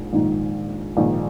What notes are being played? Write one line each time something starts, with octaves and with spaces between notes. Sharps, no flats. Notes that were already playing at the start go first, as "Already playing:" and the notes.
Already playing: A#1 G#2
A#1 G#2 D#3
A#1 G#2 D#3